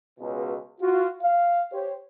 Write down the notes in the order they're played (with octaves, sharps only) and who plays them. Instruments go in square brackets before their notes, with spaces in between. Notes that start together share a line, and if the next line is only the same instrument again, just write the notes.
[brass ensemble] C#2 B2
F4 F#4
F5
G4 C5 C#5